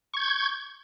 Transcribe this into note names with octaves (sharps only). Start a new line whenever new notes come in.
C#6 G6 G#6